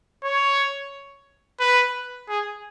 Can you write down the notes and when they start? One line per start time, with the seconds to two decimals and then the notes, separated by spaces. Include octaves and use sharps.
0.24 C#5
1.60 B4
2.29 G#4